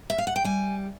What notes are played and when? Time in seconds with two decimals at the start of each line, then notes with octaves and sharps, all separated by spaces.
0.10 E5
0.18 F5
0.27 F#5
0.36 G5
0.44 G3 G#5